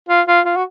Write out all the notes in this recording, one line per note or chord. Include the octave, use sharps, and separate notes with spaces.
F4
F4
F4
F#4